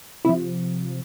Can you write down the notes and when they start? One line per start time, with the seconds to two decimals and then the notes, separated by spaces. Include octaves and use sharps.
0.25 C3 F3 E4